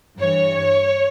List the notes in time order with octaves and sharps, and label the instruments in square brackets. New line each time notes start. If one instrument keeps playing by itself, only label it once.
[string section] G2 E3 C#5